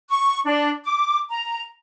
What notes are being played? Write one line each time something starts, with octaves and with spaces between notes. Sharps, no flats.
C#6
D4
D6
A#5